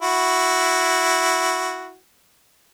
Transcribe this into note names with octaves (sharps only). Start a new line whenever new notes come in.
E4 F#4